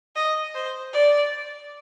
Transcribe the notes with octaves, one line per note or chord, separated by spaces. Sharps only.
D#5
C5
D5